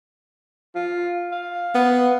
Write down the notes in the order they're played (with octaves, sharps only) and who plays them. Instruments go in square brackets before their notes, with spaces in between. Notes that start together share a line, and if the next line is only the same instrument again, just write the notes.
[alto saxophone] F4
F5
[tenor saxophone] B3